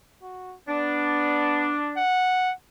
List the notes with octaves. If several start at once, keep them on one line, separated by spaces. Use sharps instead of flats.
F#4
B3 D4
F#5